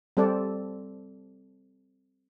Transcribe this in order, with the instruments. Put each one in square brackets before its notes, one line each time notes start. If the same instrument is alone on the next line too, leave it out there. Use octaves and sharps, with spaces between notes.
[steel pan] G3 C4 A4 D5